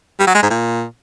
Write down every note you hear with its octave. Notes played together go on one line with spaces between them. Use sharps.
G3
F#3
G#3
G#2
A#2